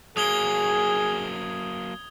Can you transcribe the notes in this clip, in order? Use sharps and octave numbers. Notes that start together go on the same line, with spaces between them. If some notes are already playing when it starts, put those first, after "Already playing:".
F#3 A#3 G#4 D#6 G#6 G7